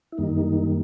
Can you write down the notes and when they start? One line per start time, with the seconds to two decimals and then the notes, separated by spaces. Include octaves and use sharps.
0.12 E4
0.18 F#2 D#3 G3 A#3 D#4